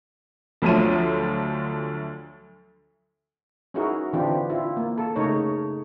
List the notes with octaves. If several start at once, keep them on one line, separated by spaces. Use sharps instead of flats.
D2 D3 F3 F#3 A3 D#7
C#4 D#4 E4 F#4 G#4 A#4
D3 E3 C4 D4 F4 G4
E4 F4
A#3
A4
C#3 A3 D#4 A#4 C#5